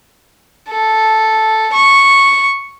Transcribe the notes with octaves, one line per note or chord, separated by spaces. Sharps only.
A4
C#6